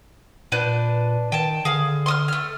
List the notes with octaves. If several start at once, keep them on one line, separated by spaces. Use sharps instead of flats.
A#2 D4 B4 G6
D#3 G5 A5
D3 G#4 F5
C6 D#6 F6
A3 F6